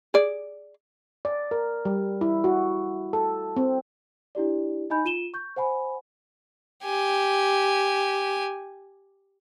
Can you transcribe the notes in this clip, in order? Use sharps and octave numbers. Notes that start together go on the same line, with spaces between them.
G#4 D5
D5
A#4
G3
E4
F#4
A4
C4
D4 E4 G4 D5
D#4 D#5 G#5 B5 G6
F4 D#7 E7 G7
C#6 G6
C5 F#5 G#5 B5
G4 G#5